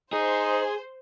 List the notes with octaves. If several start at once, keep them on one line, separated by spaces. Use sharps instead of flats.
D#4 G#4 C5